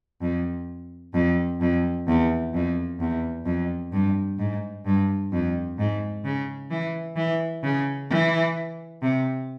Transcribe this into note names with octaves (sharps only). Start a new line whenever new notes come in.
F2
F2
F2
E2
F2
E2
F2
G2
G#2
G2
F2
G#2
C#3
E3
E3
C#3
E3
C3